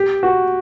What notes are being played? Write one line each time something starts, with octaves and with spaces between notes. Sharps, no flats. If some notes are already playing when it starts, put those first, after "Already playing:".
Already playing: G4
F#4